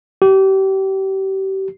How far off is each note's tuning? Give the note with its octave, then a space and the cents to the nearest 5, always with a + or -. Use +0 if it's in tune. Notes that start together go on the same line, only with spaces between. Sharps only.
G4 -30